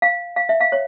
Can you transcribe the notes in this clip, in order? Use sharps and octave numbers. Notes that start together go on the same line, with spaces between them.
F5
F5
E5
F5
C#5